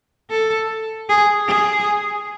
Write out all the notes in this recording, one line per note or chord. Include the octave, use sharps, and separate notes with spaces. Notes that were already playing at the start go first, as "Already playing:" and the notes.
A4
G#4
G#4